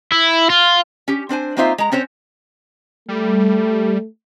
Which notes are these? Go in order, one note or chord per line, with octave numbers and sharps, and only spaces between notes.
E4
F4
C#4 G4
C4 D4 C5 G#5
A#3 C4 D#4 F4 C5 E5
G#3 A#5
C4 C#4 C5 C#5
G3 A3